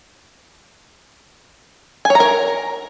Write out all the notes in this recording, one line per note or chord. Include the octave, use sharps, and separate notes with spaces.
G#5
C#5
A#5
A#4